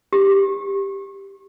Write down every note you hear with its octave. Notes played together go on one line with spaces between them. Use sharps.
G4